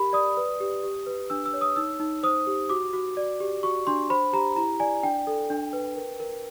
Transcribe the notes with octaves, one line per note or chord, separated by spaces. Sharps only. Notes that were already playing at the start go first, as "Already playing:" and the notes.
Already playing: G4 A#4 B5
D5 D#6
B4
G4
G4
B4
D4 E6
E6
C#5
D#6
D#4 E6
D#4
C5 D#6
G4
F#4 D6
F#4
D5
G4
F#4 C#6
D4 C6
C5 B5
G4 A#5
E4 A#5
D5 G#5
D4 G5
A4
D4
B4
A#4
A#4